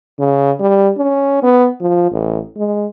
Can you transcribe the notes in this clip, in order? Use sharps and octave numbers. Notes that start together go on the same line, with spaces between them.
C#3
G3
C#4
B3
F3
A1
G#3